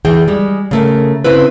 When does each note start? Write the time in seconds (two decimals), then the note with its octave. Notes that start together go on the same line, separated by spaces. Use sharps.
0.05 E2 E3 G#4 G5
0.28 G3 G#3
0.71 C#3 A3 A#4
1.24 C#3 C4 E4 B4